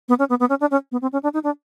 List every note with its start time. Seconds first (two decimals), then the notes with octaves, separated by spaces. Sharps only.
0.09 B3
0.19 C#4
0.29 B3
0.40 B3
0.50 C#4
0.61 D4
0.71 C#4
0.92 B3
1.02 C4
1.13 C#4
1.23 D4
1.34 D#4
1.44 D4